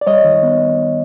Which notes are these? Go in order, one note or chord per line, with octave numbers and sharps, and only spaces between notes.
D5
G3 C#5 D#5
D#3
B3